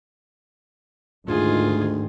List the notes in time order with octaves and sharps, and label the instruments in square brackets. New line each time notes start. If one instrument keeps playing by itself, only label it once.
[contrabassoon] D2 [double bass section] G#2 D#3 [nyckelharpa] F4 G#4